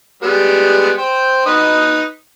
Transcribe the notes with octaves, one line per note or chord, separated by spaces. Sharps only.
G3 G#3 B3
C5 G5
D#4 B4 D#5